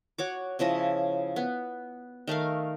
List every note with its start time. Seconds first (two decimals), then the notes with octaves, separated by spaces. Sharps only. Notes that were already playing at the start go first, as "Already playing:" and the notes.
0.18 F#4 C#5 D6
0.59 C#3 F3 E4 D#5
1.36 B3
2.28 D#3 A3 A#4 F5